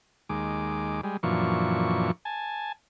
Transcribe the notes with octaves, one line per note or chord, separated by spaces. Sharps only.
D#2 G#3 D6
G3 G#3
F#2 A#2 E3 F3 D4 C#6
G#5 A5